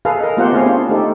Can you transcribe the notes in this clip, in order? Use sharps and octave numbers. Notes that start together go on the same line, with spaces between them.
G#4 A4 B4 F5
A#4 D#5
A3 B3 F4 G4 C5 F#5
B3 C4 E4 G#4 C#5 F5
C#4 D4 F4 C5
A3 D#4 G4 A4